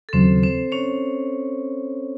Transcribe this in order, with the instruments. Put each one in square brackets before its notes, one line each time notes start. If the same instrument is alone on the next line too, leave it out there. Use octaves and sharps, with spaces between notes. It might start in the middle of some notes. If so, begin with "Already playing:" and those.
[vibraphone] A4
[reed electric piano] D#2 C#3 F#3 [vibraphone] C4 C5
[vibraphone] C4 C5
C#4 C#5